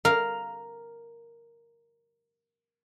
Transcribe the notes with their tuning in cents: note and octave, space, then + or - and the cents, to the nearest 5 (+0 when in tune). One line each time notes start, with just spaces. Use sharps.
A#4 +0 F5 +0